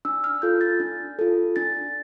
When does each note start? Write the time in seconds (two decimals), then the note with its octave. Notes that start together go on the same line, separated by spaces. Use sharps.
0.05 D4 E6
0.24 F6
0.42 F4 A4 G6
0.61 A6
0.80 D4
1.19 F4 A4
1.56 D4 A6